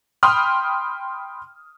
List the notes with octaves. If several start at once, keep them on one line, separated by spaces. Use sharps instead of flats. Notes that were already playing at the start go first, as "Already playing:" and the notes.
G5 B5 C6 D#6 F6